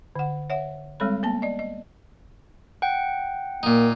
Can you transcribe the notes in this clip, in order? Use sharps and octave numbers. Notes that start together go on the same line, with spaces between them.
D3 F#5
C#5 E5 F#5
G3 G#3 C4 A4 C#5 B5
A#3 B3 A5
D5 D#5
D#5
F#5 G5
A#2 A#3 D#4